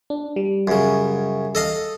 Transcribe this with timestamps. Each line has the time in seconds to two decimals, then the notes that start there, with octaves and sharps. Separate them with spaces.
0.10 D4
0.36 G3
0.67 F#2 C#3
1.55 A4 D#5 F5